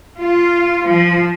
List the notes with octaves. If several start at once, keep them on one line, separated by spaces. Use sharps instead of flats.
F4
F3